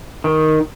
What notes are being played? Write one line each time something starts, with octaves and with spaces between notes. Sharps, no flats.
D#3